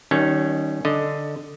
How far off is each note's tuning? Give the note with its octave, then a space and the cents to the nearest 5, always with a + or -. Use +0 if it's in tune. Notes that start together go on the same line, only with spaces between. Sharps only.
D#3 +0 G3 -35 C#4 +0
D3 +0 D#5 +0